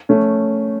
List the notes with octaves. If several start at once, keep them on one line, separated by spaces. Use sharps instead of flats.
A3 C#4